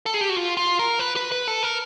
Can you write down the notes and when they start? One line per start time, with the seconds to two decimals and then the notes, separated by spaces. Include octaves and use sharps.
0.06 A4
0.14 G#4
0.21 G4
0.29 F#4
0.37 F4
0.57 F4
0.79 A#4
0.99 B4
1.16 B4
1.32 B4
1.48 A4
1.63 A#4